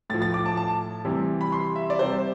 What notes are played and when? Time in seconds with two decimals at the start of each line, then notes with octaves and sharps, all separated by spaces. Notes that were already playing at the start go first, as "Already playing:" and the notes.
0.10 A2 A6
0.14 F3
0.22 A6
0.34 D6
0.46 A5
0.57 A5
1.05 C3 E3 G3
1.41 B5
1.52 C6
1.76 E5
1.90 D5
1.99 C3 G3 C5